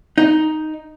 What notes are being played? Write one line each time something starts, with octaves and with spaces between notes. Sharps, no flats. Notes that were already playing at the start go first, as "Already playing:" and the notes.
D#4